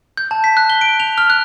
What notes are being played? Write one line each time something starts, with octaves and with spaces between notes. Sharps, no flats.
G6
A5
B6
F#6
G7
D7
F7
F6
F#6